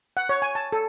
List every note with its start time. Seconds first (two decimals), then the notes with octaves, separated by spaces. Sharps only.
0.17 F#5
0.29 C#5
0.42 G#5
0.55 A5
0.73 A4